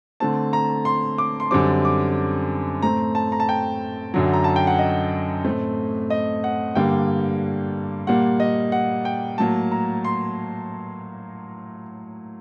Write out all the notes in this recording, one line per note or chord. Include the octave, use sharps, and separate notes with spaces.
D3 A3 C4 A5
A#5
C6
D6
C6
F#2 D3 G3 C4 D6
D6
A2 A3 C4 A#5
A5
A#5
A5
G5
F#2 D3 F#3
A#5
A5
G5
F#5
D#5
A2 A3 C4
D#5
F#5
G2 D3 G3 A#3 G5
A#2 G3 A#3 F#5
D#5
F#5
G5
A2 F#3 A#3 A5
A#5
C6